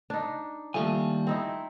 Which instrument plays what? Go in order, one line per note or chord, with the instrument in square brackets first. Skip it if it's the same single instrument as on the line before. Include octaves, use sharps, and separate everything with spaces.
[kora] D4 D#4
[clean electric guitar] D#2 G3 G#5 [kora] F3 A3
[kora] C4 D#4 E4